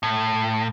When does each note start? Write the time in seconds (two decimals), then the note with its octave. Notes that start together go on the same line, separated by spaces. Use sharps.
0.03 A2